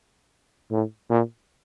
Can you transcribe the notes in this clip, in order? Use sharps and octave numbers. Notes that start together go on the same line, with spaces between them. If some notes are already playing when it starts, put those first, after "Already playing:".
A2
A#2